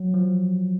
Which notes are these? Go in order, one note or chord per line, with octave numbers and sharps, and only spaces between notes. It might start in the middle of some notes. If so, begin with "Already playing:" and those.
Already playing: F#3
F3